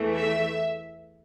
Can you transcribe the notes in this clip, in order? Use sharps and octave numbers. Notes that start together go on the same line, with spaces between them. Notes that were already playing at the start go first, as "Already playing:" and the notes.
Already playing: E2 E3 A3
E5